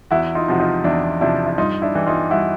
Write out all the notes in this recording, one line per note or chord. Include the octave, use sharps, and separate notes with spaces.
E2 E4 F#4
D#4 F4
C3 F3 F#4
D#4 F4
E2 D4 E4
C3 F3 D4 E4
E4
G2 D#4 F4
D4 E4
E3 G3
D#4 F4
G2 E4 F#4